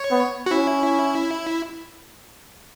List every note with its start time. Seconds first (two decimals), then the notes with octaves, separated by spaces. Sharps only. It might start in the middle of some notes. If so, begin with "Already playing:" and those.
Already playing: C#5
0.11 B3
0.46 F#4
0.51 C#4 E4